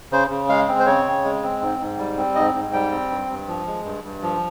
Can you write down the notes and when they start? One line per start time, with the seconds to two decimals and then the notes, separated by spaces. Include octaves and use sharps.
0.12 C#3 C5
0.30 C#3
0.49 G#3 F5
0.68 C4
0.79 C5
0.86 C#3 C#5
1.06 C#3
1.24 G#3
1.43 C4
1.61 G#2
1.79 G#2
1.98 G3
2.17 C4
2.35 G#2 D#5
2.54 G#2
2.73 G3 G5
2.91 C4
3.10 G2
3.29 G2
3.47 F3
3.67 G#3
3.85 G2
4.04 G2
4.22 F3